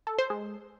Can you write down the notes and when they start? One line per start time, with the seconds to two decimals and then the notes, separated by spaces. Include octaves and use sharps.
0.07 A4
0.18 C5
0.30 G#3